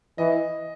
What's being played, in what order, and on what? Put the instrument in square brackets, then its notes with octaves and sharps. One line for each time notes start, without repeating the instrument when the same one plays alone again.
[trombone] E3 [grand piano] D#5